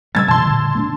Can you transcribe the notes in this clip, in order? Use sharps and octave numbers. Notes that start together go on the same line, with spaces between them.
C#3 G3 A3 E6 G#6 A6
F#2 B2 E3 A5 C6
A#2 D3
A3 A#3 D4